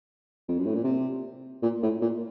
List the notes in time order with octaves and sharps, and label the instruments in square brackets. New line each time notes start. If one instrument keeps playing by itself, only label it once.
[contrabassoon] F2
F#2
A2
A#2
C3
A#2
A2
A#2